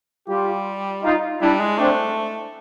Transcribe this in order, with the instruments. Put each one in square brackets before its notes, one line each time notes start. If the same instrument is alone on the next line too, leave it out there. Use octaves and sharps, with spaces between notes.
[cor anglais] G3 [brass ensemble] F4 G4
[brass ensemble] D#4 F4
[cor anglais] G3 [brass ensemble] D4 E4
[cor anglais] G#3
[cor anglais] A3 [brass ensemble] C4 D4